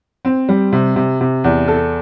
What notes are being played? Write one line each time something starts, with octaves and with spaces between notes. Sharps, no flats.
C4
G3
C3
C3
C3
E2
A4